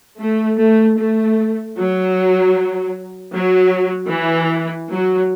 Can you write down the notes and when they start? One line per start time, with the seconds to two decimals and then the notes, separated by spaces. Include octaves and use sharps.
0.20 A3
0.60 A3
0.98 A3
1.77 F#3
3.34 F#3
4.12 E3
4.90 F#3